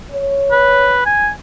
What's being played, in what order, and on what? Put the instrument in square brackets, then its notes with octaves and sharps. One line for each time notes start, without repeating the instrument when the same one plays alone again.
[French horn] C#5
[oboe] B4
G#5